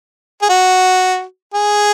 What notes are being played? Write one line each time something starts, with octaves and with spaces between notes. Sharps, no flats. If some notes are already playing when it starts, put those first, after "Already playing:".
G#4
F#4
G#4